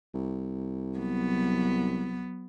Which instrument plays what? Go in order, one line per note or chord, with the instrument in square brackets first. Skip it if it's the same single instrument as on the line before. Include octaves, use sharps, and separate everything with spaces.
[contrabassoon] C2
[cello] F#3 B3